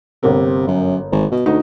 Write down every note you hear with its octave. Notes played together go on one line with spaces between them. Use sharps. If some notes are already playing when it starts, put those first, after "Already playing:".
G1 C3 A#3 A#4
F#2
G#1
B2
D2 D#4 F#4